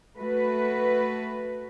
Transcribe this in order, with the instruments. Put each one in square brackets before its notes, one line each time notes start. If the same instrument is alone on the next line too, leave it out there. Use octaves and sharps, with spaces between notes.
[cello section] A3 F#4 B4